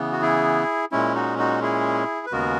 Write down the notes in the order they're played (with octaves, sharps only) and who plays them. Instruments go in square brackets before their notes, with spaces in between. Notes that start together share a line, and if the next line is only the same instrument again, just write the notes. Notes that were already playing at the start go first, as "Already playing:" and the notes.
Already playing: [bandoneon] C#3 E3 B3
F#4
E4 G#4
A#2 G#3 C#4 E4
D#4 F#4
D#4 F#4
E4 G#4
B4
D#2 C#3 G#3 B3 F#4 A#4